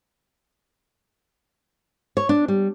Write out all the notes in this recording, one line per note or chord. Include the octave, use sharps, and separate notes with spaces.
C#5
D4
G3